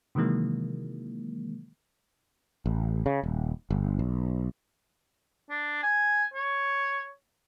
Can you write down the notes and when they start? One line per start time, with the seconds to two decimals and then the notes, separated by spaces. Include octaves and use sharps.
0.15 C3 D#3 E3 F#3 G#3 A#3
2.66 A1
3.06 C#3
3.23 D#1
3.70 G1
3.99 B1
5.50 D4
5.83 G#5
6.34 C#5